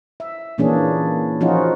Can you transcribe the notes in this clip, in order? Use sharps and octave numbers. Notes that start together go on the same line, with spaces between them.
E5
A#2 E3 A#3 C#4 D4 G#4
F3 C#4 D#4 F4 F#4